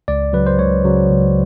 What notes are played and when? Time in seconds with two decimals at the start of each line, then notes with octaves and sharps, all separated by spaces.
0.08 C#2 D5
0.33 C#3 F#3 B4
0.46 C5
0.59 C#2 C#5
0.84 C#3 F#3
1.09 C#2